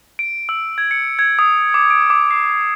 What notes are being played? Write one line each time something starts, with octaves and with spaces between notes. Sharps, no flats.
D7
E6
G#6
C#7
G#6
D#6
D6
D7
D6
C7